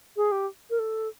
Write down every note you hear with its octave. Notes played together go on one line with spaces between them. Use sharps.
G#4
G4
A#4
A4